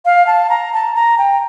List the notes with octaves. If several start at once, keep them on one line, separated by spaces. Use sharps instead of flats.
F5
A5
A#5
A5
A#5
G5